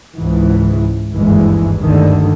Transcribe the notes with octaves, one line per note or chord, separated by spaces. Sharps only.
C#2 G#2 E3
G1 D#2 G#2 E3 G#3
D2 G2 D3 D#3